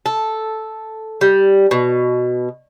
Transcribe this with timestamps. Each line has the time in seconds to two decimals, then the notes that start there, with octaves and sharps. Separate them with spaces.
0.06 A4
1.21 G3
1.71 B2